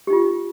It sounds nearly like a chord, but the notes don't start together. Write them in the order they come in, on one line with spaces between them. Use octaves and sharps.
G4 D#4 F4